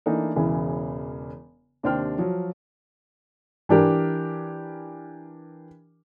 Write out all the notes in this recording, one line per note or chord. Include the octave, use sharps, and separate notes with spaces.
E3 A3 A#3 D4 D#4
E1 C#3 E3
D#2 C3 D4 C5 G5 F6
F3 F#3
E3 D4 G4 A#4